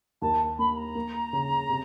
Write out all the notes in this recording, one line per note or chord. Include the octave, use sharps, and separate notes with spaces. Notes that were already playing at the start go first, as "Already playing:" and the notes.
D#2 A5
A#3 B5
A#5
A#3
C#3
C3